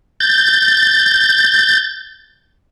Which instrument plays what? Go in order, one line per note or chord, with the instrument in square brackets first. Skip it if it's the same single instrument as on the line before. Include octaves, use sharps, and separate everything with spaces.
[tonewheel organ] G6 A6